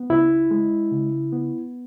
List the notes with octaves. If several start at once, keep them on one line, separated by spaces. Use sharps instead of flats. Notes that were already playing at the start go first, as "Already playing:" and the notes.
Already playing: B3
C#2 E4
G#3
C#3
B3